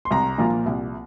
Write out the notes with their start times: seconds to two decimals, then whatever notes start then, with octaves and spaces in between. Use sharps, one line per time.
0.05 C6
0.11 C2 A#5
0.38 A#2 F3 A#3 F4
0.66 C2